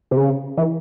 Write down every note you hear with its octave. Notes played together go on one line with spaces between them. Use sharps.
C3
C#3
E3